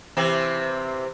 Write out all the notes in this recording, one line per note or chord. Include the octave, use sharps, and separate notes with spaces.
C3 E3 C4